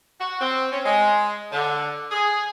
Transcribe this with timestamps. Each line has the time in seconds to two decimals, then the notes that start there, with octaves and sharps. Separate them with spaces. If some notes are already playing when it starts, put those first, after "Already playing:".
0.20 F#4
0.40 C4
0.72 C#4
0.84 G#3
1.51 D3
2.11 G#4